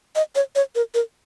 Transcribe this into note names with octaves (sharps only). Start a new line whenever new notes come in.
D#5
C#5
C#5
A#4
A#4